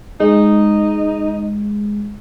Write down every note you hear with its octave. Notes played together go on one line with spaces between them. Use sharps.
G#3 D#4